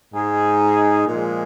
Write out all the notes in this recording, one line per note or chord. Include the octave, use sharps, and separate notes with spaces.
G#2 G#3 D#4 G#4
A#2 F3 G#3